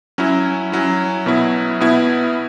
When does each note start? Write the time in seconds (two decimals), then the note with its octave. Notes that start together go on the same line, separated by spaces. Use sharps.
0.18 F#3 C#4 E4
0.72 F#3 C#4 E4
1.26 B2 F#3 B3 E4
1.80 B2 B3 E4